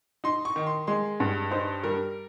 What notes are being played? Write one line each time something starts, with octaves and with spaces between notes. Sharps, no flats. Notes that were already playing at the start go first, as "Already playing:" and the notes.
D#4 C6
C#6
D#3
C6
G#3 C6
G2
D#4 C5
G3 A#4